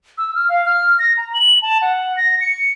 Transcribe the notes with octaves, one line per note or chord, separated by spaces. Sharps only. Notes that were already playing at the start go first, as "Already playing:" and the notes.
E6
F6
F5
F6
A#6
A#5
F#7
A5
F#5
A#6
C#7